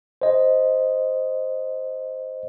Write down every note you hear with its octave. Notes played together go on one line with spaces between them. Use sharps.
C5 D#5